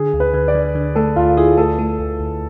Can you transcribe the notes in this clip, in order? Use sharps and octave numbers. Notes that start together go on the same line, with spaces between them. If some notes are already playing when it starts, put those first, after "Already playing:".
Already playing: D3 G#4
D2
B4
D3
D5
D3
D3
A3 A4
D2 F4
E4 G#4
A3 A4
A3
D2
D2